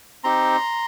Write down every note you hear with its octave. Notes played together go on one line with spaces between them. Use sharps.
C4 D#4 G4 A#5 C6